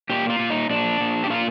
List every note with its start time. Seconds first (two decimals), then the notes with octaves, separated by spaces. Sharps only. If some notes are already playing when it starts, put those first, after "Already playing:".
0.09 A#2 G4
0.30 F4
0.39 A#2
0.50 D#4
0.70 A#2 D4
1.00 A#2
1.24 G4
1.30 A#2 F4